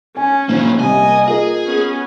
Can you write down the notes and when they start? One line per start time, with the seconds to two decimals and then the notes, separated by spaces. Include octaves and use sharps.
0.17 C#4 G#5
0.49 A#1 F#3 A#3
0.80 C2 A#3 D#5 G#5
1.28 F4 G#4 A#4
1.65 B3 C#4